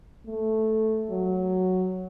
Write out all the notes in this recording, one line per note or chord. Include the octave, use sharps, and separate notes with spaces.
A3
F#3